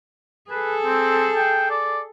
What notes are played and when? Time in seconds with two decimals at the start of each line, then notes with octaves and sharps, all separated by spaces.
0.50 G#4 A4 B4
0.85 C4
1.36 G5
1.70 D5